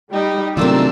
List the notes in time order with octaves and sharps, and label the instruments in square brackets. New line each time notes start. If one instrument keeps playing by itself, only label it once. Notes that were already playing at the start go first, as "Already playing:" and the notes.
[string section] G3 G4 [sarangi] D#4
[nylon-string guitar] C3 A3 F4 [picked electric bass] D#3 F#3 [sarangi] D4 [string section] A#4 E6